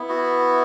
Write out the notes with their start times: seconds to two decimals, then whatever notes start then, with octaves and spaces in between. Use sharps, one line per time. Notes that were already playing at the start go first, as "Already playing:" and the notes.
Already playing: B3 E4
0.09 F#4